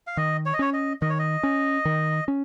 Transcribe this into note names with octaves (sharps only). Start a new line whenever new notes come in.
F5
D#3 D#5
C#5
D#5
C#4 C#5
D#5
D#3 D#5
C#5
D#5
C#4
D#3
C#4